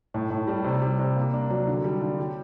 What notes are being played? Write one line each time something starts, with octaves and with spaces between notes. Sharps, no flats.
A2
A2
G3
C3
G3
C3
A#3
D4
F#3
D3
G3
D3
G4